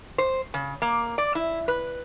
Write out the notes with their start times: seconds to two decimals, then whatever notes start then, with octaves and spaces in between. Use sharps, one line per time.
0.18 C5
0.54 C#3
0.82 A#3
1.18 D5
1.35 E4
1.68 B4